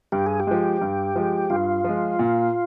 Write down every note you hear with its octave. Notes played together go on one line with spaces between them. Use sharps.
G2 G4
G#4
G4
F3 G#3
G2
F3 G#3
G2 F4
F3 G#3
A#2